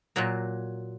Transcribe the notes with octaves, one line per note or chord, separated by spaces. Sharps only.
A#2 F#3 A#3